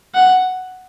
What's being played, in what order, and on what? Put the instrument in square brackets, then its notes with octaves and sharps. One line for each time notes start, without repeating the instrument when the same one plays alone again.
[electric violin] F#5